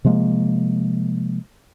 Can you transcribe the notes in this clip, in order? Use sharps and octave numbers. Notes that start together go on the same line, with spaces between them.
C3 F3 G#3 A#3